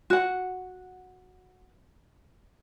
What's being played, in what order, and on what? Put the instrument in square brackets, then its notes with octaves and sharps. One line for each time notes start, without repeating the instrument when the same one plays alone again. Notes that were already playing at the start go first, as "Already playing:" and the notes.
[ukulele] F#4 F#5